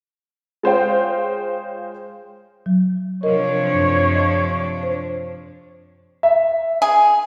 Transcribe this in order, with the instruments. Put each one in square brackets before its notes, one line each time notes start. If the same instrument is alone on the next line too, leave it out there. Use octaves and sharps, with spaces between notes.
[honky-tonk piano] G#3 F4 C5 C#5 F5 G5
[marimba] F#3
[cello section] C3 F3 D4 [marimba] A#4 D#5 [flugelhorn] C#5
[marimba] F#2
D#5
C5
[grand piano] E5
[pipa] G#4